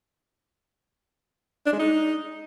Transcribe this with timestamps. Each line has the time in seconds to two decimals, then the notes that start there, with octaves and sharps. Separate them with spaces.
1.66 D4
1.73 G#3
1.79 D#4